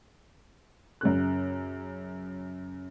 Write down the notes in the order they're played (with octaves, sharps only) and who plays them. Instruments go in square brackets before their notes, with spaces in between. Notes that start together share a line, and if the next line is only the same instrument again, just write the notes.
[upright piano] F#2 C#3 F#6